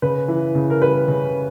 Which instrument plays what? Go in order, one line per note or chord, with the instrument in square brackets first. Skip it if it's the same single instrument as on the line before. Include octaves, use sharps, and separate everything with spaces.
[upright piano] C#3 [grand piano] B4
[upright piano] E3
C#3
[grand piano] A#4
[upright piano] G3 [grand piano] B4
[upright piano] C#3